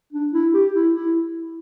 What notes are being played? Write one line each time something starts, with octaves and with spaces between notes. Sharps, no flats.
D4
E4
G4
E4
E4